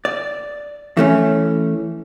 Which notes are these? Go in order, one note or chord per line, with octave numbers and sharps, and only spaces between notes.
D5
E3 A3 C#4